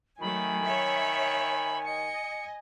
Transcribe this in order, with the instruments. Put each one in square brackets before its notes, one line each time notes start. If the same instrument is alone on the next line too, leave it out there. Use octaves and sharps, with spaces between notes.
[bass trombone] D#3 [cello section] F#3 A3 [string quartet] G#5 [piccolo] B5
[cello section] C#5 E5
[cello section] D#5 [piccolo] C#7